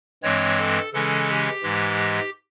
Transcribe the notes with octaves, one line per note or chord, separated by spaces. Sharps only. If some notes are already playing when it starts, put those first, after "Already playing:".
G2 E3 G#3 C4 C#5
A4
C#3 E3 G#3 C#4 A4
G4
G#2 E3 G#3